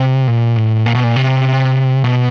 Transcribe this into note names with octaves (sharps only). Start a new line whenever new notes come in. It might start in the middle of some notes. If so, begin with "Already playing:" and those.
Already playing: C3
A#2
A2
A#2
B2
A#2
C3
B2